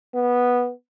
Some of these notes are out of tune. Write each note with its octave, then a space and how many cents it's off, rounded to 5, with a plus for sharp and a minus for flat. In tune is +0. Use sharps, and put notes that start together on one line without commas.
B3 -10